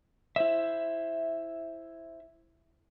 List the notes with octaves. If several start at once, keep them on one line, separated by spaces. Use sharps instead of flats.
E4 C5 E5